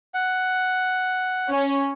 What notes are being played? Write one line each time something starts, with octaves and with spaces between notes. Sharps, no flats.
F#5
C#4